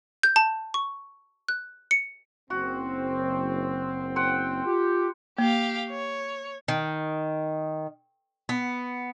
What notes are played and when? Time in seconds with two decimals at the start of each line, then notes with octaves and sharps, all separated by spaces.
0.23 G6
0.36 A5
0.74 C#6
1.48 F#6
1.91 C#7
2.50 F#1 C4 F#4
4.16 C5 F#5 G5
4.66 F4 G4
5.38 A#3 G4 F5
5.90 C#5
6.68 D#3
8.49 B3